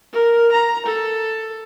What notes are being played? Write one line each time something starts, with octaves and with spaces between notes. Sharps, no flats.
A#4
A#5
A4